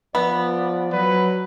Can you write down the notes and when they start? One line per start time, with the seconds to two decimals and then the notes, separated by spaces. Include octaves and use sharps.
0.15 F3 B3 D5
0.93 F#3 B4